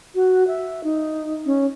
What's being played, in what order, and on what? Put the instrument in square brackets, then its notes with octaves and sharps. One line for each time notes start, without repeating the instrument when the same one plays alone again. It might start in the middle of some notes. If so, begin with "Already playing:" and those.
[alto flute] F#4
E5
D#4
C#4